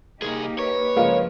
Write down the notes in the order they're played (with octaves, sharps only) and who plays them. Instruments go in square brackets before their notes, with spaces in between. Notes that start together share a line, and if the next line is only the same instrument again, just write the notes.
[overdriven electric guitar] C2 G#4 [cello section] A#3 D#4 G4
[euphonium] B4 [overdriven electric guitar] C#5
[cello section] G2 C#3 F3 [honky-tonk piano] G#3 A#3 F4